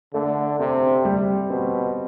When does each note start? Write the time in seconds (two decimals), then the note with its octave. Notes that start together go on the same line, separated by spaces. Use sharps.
0.14 D3 A3
0.59 C3 C4
1.05 G3
1.50 B2 C4